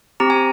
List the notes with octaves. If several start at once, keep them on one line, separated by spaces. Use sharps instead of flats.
C4 G4 A#5
G#5